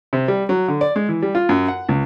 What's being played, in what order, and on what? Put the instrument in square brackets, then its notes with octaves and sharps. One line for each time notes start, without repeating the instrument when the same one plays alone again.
[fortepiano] C3
G3
F#3
D3
D5
G#3
E3
G3
F4
F#2
F#5
C#2